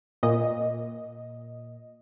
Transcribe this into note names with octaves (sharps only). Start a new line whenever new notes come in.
A#2 D#5